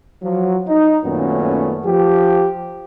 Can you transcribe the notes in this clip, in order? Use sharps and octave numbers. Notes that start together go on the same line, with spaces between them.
F3 F#3
D#4
F#2 A#2 D#3 A3 B3 C#4
F3 G4